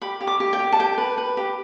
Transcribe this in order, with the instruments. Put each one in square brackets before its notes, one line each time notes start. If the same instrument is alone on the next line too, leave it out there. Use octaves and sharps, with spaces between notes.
[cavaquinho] G4 B5
G4
D6
G4
G5
G4
A5
G4 G5
B4
B4
G4